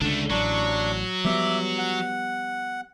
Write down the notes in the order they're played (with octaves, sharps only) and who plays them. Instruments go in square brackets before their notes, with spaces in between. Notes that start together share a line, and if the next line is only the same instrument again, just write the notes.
[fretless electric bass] C#2 D3 [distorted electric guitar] A3 D4
[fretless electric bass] A1 [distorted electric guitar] F#3 [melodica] D4 C#6
[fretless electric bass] F3 G3 B3 [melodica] E5 D6
[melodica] F#5